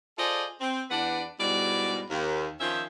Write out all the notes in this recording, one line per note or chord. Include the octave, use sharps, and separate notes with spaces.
F4 G#4 A4 C5 D5 D#5
C4
E2 D4 B4 D5 F#5
G#2 B2 G3 G#3 E4 D5
D#2
D#3 F3 C#4 F4 C5 E5